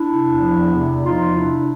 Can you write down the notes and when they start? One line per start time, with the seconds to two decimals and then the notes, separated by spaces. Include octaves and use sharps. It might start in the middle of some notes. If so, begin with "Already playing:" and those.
Already playing: D4 E4
0.09 C3
0.25 E2
0.41 F3
0.57 E2
0.73 C3
0.89 E2
1.05 F3 D#4 F4
1.21 E2
1.36 C3 D4 E4